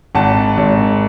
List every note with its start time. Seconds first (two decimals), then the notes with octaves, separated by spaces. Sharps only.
0.15 G#1 F#5 A5
0.57 G#1